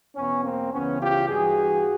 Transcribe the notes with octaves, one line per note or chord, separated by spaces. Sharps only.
E2 B2 B3 C#4
A#3 C4
C#2 C#3 E3 B3 C#4
F4 G4
G2 E3 F#4 G#4